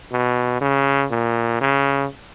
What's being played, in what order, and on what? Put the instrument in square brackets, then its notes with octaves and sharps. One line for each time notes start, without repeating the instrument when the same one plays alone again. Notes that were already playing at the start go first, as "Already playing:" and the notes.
[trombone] B2
C#3
A#2
C#3